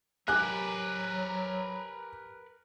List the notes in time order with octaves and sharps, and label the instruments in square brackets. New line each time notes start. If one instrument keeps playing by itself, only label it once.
[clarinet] F#3 [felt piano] G4 G#5 D6 [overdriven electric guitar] A#4 B4 [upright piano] F#6